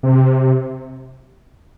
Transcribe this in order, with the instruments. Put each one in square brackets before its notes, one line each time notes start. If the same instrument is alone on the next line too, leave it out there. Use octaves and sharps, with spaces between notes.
[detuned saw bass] C3